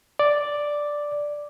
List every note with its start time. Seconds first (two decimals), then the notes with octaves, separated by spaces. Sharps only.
0.19 D5